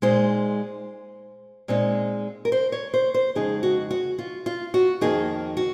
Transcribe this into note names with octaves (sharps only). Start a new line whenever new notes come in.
A#2 G#3 D#4 C5
A#2 G#3 C4 D#4
A#4
C5
C#5
C5
C5
F2 C#3 G#3 D#4 G#4
F#4
F#4
F4
F4
F#4
F2 D#3 A#3 D#4 G#4
F#4